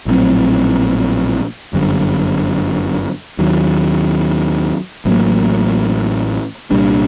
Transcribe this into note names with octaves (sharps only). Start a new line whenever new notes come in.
A#1 A2 F#3 C4
G1 F#2 D3 G3
D#2 D#3 F#3
A1 A2 F#3 A#3
C2 A#2 G3 D4